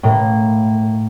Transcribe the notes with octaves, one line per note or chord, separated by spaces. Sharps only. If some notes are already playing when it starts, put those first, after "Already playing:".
A2 A#3